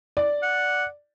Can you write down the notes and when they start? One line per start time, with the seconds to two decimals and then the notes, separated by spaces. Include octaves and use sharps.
0.17 D5
0.43 F#5